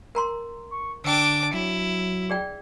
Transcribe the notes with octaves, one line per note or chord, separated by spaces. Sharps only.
A#4 A#5 C6
C#6
D3 D4 G5 D6 E6
F#3 E4
G#4 D5 G5